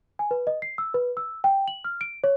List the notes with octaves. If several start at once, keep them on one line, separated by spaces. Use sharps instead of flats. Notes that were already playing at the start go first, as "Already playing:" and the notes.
G#5
B4
D#5
C7
E6
B4
E6
G5
F#7
F6
D7
C#5